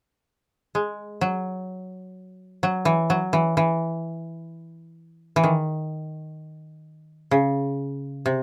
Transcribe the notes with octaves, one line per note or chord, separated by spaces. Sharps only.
G#3
F#3
F#3
E3
F#3
E3
E3
E3
D#3
C#3
C3